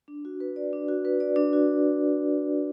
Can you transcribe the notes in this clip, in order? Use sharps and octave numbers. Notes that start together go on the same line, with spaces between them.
D4
F#4
B4
D5
D4
F#4
B4
D5
D4
F#4